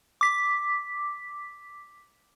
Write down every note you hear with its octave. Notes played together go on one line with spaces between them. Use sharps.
D6 B6